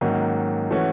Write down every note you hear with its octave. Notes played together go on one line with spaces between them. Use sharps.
G#2 D#3 F#3 A#3 C#4
E3 A3 C#4 F#4